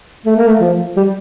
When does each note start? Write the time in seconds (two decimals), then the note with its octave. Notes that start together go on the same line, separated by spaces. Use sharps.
0.25 A3
0.36 A#3
0.47 A3
0.60 F3
0.97 G3